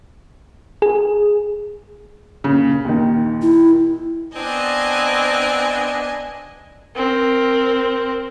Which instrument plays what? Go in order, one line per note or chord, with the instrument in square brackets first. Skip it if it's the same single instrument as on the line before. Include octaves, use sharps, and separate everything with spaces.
[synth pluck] G#4
[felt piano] A#2 C#3
D#2 A#2 D#3
[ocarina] E4
[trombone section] B3 D4 [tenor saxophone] C4 [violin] D#5 G#5
[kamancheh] C4 A#4